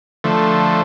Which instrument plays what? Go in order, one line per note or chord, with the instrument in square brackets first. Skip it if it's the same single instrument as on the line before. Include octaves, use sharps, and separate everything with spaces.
[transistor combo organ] D3 F3 A3